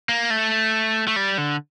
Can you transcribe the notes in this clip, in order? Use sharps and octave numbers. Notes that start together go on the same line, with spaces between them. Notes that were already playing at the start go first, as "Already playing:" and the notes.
A#3
A3
A3
G3
D3